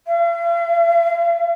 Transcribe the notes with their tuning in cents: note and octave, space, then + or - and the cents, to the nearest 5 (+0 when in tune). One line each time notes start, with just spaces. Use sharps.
F5 -45